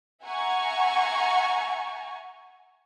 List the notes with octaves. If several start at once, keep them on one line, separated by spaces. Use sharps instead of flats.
E5 F#5 G#5 A#5 C#6